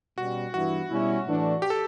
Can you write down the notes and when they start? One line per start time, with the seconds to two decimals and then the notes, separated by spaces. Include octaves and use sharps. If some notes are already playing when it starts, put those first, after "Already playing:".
0.18 B2 G3 C#4 F#4
0.53 G2 E3 B3 E4 F#4
0.89 B2 G3 C#4 E4
1.26 A2 E3 A3 D4
1.62 G4
1.70 A4